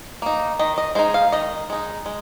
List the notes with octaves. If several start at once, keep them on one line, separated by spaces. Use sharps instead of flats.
A#3 D#4
D#3 D#5
D#5
G#3 D#4 C5
F5
D#3 D#5
G#3 D#4
G#3